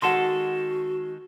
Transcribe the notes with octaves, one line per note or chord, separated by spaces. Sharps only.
D#3 G#3 F#4 A4 F#5 A5 C6